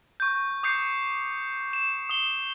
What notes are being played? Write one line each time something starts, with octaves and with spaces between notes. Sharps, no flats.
C#6 G6
D6 D#6 G6 C7 C#7
E7
D#6 G7